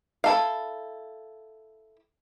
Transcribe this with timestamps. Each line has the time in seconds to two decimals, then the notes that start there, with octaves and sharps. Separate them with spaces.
0.24 E4 A4 F5